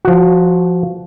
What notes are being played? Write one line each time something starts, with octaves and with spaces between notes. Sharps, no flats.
F3 F#4